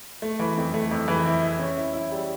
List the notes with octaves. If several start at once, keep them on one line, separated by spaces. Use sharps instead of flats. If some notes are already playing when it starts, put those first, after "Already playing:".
A3
E3
F2
A3
F2
E3
E4
E4
C#4
E4
E4
G3